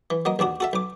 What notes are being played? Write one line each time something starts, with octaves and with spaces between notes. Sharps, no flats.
E3
F#3 A#3 D#5
A#1 D#2 D4 F#4
F#4 A4 E5
B1 D6